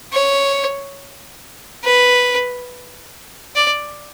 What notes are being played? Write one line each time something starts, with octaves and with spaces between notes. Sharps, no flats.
C#5
B4
D5